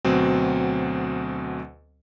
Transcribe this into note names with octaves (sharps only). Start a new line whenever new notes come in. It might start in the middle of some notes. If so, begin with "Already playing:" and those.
D2 B2 F#3 C4